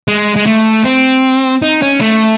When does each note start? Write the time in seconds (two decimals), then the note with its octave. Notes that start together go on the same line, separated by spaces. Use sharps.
0.08 G#3
0.36 G#3
0.46 A3
0.85 C4
1.62 D#4
1.82 C#4
2.01 A3